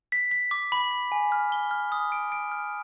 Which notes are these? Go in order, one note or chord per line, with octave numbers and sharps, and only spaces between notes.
B6
B6
D6
B5
B6
G#5
F6
G7
F6
D#6
D7
D7
F6